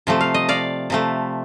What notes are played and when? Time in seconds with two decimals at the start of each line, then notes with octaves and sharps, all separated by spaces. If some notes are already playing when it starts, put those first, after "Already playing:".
0.07 C3 F3 A3
0.21 F5
0.34 D#5
0.49 D5 F5
0.90 C3 F3 A3